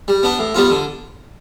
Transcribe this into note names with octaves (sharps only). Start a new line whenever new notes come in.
G3
B3 D4
A2
G3 B3 F4
D3